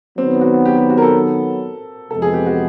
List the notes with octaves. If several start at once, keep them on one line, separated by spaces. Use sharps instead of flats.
D#3 F#3 B3 C4
F#4
G4
G4
F#4
A#4
A4
F2 C3 E3 G#3 B3 A4
G#4
G4
F#4